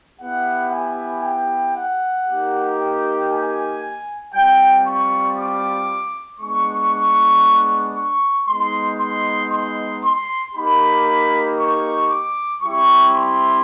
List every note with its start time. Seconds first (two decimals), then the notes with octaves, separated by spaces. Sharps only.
0.20 B3 E4 G4 F#5
0.72 G#5
1.24 G5
1.75 F#5
2.27 A#3 D#4 G4
2.79 G5
3.31 G#5
4.34 G3 C4 F4 G5
4.85 C#6
5.37 D6
6.40 G#3 B3 D4 C#6
7.96 C#6
8.47 G#3 B3 D#4 C6
8.99 C6
9.51 C6
10.02 C6
10.54 A#3 D#4 G4 B5
11.57 C#6
12.09 D6
12.61 G3 C4 E4 G4 C#6
13.13 C6